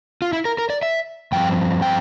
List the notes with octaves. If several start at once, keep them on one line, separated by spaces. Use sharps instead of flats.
F4
E4
A#4
A#4
D5
E5
G2 F3 C4 G5
G5